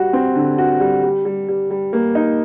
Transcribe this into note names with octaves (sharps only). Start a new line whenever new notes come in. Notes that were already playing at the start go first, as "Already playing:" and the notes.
Already playing: G3 F#4
C4
D3
F#4
G3
G3
G3
G3
G3
A#3
D#4